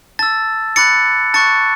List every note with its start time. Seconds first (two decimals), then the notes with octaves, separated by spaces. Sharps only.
0.19 A5 E6 A6
0.76 B5 D6 F#6 A6 C#7
1.34 A5 C#6 F#6 A6 C#7